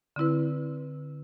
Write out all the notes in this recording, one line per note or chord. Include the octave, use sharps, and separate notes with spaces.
D3 C4 E4 B4